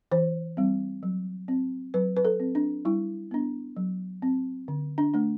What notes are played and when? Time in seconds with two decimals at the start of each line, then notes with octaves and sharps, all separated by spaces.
0.11 E3 C5
0.57 G3 C4
1.03 F#3
1.48 C4
1.94 F#3 B4
2.17 B4
2.25 A4
2.40 C4
2.55 D4
2.85 G3 E4
3.31 B3 D4
3.77 F#3
4.22 C4
4.68 D3
4.98 D4
5.14 A3 D4